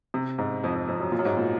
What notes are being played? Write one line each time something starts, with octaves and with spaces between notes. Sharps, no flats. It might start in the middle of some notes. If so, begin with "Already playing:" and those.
C3
G#2
F2
F2
F2
F#2
A#2
F#2
G#2
A#2